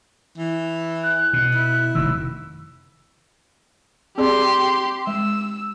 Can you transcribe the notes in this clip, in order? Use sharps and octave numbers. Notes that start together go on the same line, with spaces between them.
E3
F#6
B2
E4
F1 F#2 D#3 E6
C4 G4 G#4 D5 C6
G#3 E6